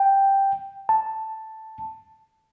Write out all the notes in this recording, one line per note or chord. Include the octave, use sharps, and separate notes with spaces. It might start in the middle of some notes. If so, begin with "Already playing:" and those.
Already playing: G5
A5